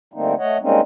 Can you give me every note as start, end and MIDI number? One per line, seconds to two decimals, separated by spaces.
0.14 0.35 50
0.14 0.35 55
0.14 0.35 57
0.14 0.35 58
0.14 0.35 60
0.14 0.35 63
0.39 0.58 57
0.39 0.58 73
0.39 0.58 75
0.39 0.58 78
0.62 0.81 55
0.62 0.81 56
0.62 0.81 58
0.62 0.81 60
0.62 0.81 61
0.62 0.81 63